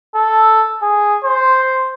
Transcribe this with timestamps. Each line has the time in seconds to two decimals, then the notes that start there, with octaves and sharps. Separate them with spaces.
0.14 A4
0.82 G#4
1.24 C5